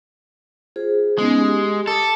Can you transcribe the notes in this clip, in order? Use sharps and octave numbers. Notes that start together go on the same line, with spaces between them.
F4 G#4 C5
G#3 B3 C#4 D#4
G4
A4 D6